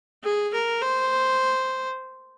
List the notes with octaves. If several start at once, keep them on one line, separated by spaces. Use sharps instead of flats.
G#4
A#4
C5